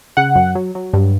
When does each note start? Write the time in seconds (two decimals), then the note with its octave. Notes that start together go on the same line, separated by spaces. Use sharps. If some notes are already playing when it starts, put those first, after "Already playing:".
0.17 C#3 F#5
0.36 F#2
0.55 F#3
0.75 F#3
0.93 G2